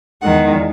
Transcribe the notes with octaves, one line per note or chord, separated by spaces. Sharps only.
E2 D#3 G#3 F#5